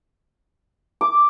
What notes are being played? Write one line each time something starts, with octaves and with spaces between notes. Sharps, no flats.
D6